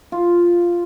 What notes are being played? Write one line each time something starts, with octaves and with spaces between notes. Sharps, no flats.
F4